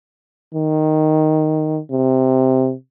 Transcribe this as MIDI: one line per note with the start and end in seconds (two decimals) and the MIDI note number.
0.54 1.79 51
1.90 2.72 48